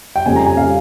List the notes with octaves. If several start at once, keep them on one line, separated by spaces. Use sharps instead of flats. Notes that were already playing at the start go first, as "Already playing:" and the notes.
G5
F2 C#3 G3 G#5
A#5
G#5
C#3 G3 F5